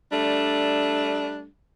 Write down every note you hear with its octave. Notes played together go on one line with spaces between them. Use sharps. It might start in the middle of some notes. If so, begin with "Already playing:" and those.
G3 A3 D4